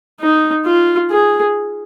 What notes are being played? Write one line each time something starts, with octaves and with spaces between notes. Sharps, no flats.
D#4
F4
G#4